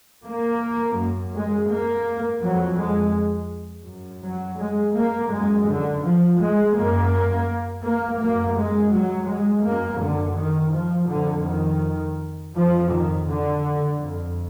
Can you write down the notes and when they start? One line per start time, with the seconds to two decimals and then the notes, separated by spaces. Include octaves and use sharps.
0.25 A#3
0.97 F#2
1.33 G#3
1.69 A#3
2.42 F2 F#3
2.78 G#3
3.86 F#2
4.23 F#3
4.59 G#3
4.95 A#3
5.31 F#2 G#3
5.67 D3
6.03 F3
6.40 G#3
6.76 F#2 A#3
7.84 A#3
8.20 F#2 A#3
8.57 G#3
8.92 F#3
9.29 G#3
9.65 F#2 A#3
10.01 D3
10.37 D#3
10.73 F3
11.09 F2 D3
11.46 D#3
12.54 F2 F3
12.90 D#3
13.27 D3
13.99 F2